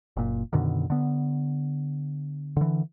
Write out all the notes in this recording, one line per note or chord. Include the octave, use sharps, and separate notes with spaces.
F#1 A#2
F#2 B2 D3 D#3
D3 B3
D3 E3